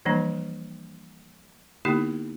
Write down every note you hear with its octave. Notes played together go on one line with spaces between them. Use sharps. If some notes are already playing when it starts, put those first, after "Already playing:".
E3 F3 G3 A#3 D4
D3 A#3 B3 D#4 E4 G4